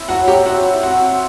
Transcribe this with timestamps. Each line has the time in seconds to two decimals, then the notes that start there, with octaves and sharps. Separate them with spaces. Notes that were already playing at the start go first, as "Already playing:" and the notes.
Already playing: C4 E4
0.09 F#3 F#4 F#5
0.27 F#3 G4 G5
0.46 C4 F#4 F#5
0.65 E4
0.83 C4 F#4 F#5
1.01 C4